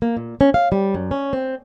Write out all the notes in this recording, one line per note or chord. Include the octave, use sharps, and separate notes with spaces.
A#3
A#2
C#4
F5
G3
F#2
C#4
C4